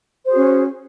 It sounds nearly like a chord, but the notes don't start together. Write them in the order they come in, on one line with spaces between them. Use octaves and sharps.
C5 G#4 F#4 C#4